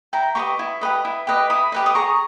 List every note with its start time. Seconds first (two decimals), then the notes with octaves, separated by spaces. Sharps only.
0.13 E4 G5 A#5
0.35 G4 B4 D#5 A#5 C#6
0.59 E4
0.81 G4 B4 D#5
1.05 E4
1.27 G4 B4 D#5
1.50 E4 B5 D#6
1.72 G4 B4 D#5
1.86 D#6
1.95 G#4 A#5 C#6